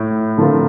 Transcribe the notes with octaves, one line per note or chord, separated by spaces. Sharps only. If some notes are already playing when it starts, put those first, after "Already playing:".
Already playing: A2
D3 F3 C4 F4 A#4